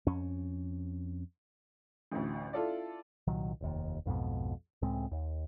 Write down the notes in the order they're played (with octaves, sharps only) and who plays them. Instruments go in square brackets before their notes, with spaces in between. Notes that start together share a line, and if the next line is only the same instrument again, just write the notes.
[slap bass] F2 C#4
[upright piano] A1 D2
E4 F4 A4 D5
[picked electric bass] C2 A#2 D#3 F#3
F1 D#2
B1 F2 G#2 B2
C#2 A2 G#3 C4
D#2